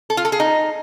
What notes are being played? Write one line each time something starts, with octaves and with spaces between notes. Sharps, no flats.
A4
F4
A4
G#4
D#4